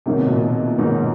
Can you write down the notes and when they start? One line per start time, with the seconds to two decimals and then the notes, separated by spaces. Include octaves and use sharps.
0.06 G#2 C3 D#3 F#3 A#3 D#4
0.16 B2
0.26 A#2
0.36 B2
0.78 G#2 B2 D#3 F#3 A#3 D#4